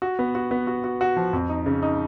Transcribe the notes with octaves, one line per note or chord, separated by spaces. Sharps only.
F#4
B3
F#4
B3
F#4
F#4
F#4
F3
F2
D#4
C#3
D#4